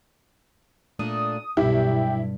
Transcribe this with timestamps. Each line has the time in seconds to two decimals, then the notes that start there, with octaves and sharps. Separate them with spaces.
0.99 A#2 A3 D4 D#6
1.57 B1 G2 B2 E4 G4